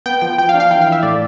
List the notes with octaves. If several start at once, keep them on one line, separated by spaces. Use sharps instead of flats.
B3 G5
F3 G5
F3 G5
F5
D4
F5
E3 G5
F5
E4
E5
A2 D5